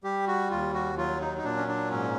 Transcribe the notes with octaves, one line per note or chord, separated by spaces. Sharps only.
G3 G4
F#4
D#2 F4
F#4
F#3 F4
D#4
D#4
A#2 D4
C#4
D4
G#2 C#4